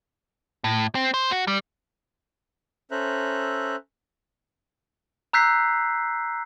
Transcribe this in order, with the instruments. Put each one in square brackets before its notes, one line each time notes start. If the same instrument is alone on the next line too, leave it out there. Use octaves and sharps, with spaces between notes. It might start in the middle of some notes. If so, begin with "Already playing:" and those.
[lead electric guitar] A2
C4
C5
F#4
G3
[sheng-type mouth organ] C#4 A4 C5 E5 A#5 F#6
[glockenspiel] A#5 E6 F#6 G6 B6 C7